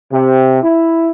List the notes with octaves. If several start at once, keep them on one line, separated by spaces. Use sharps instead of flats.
C3
E4